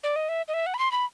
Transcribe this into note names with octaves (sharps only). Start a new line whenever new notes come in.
D5
D#5
E5
D#5
E5
F#5
B5
C6
B5